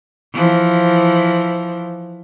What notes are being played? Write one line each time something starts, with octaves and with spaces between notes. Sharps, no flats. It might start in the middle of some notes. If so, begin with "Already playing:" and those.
E3 F3